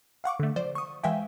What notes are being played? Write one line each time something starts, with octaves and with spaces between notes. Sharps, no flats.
F5 F#5 C#6 D6
D3 A3
F3 C5 D5
C#6 D#6
E3 G#3 E5 F5 G5 G#5